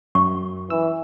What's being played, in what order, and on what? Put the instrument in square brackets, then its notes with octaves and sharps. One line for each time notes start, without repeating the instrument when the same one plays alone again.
[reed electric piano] F#2 [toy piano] C#6
[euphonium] E3 [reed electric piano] E6